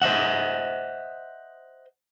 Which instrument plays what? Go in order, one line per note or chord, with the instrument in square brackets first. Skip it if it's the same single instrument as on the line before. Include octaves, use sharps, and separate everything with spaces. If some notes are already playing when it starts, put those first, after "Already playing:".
[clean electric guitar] C5 D#5 E5 F#5